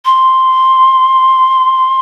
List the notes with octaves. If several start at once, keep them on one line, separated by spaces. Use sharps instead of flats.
C6